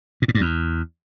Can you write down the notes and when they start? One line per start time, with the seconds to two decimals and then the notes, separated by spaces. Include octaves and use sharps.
0.22 A#2
0.28 A2
0.35 G2
0.41 E2